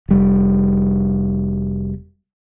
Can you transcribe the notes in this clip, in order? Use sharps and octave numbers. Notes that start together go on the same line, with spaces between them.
F1 G3